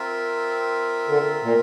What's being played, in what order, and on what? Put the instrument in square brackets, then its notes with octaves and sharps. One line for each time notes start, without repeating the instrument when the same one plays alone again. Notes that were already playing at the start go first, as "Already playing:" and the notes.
Already playing: [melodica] C4 F4 A#4 E5
[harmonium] D3
A#2